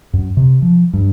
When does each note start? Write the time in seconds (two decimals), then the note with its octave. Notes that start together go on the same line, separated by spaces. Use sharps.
0.13 F#2
0.37 C3
0.62 F3
0.93 G2